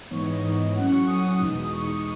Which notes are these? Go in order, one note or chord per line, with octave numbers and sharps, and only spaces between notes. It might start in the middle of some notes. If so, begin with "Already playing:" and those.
G#2 E3 B3 D#4 C#5
D#5
G#2 E3 B3 D#4
A2 F#3 C#4 F#5
C#6
A2 F#3 C#4 D#6
E2 B2 G#3 D#4
E2 B2 G#3 D#4 C#6